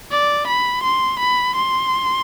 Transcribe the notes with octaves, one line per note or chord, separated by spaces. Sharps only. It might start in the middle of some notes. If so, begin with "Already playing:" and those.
D5
B5
C6
B5
C6